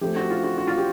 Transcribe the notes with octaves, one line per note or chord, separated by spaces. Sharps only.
F3 A3 C4 G4
F#4
F4
F#4
F#4
F4
G4